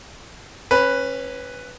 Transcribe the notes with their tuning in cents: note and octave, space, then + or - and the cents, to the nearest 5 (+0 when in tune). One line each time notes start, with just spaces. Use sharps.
C#4 -25 B4 +0